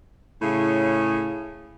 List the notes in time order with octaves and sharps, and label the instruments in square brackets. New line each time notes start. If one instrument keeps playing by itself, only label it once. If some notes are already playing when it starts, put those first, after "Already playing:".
[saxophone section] A2 C#3